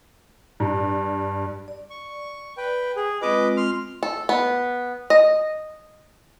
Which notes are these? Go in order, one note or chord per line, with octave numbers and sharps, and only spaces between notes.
G2
D5
C#6
B4 G5
G#4
G#3 C4 F4 B4 D#5 D6
C6 F6
A4
B3
D#5